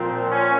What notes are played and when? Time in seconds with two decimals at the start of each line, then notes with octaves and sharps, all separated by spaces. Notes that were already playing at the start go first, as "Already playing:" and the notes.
Already playing: A#2 F3 C4
0.29 C#4